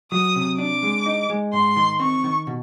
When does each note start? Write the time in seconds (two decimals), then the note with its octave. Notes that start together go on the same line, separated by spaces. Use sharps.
0.12 F#3 D#6
0.36 C3
0.58 D4 D6
0.83 G#3
1.06 D#4
1.30 G#3
1.53 G#2 C6
1.76 D#3
1.99 C4 C#6
2.24 D#3
2.47 B2